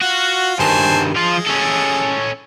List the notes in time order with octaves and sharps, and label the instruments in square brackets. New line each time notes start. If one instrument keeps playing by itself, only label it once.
[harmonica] F4 [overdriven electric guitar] F#4
[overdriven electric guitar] G2 D#3 [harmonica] C5 G#5 A5
[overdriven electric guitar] F3 F4 [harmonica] G#3
[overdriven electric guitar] C#4 A4